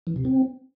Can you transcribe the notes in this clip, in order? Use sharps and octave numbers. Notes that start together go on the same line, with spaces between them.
E3
C3
C4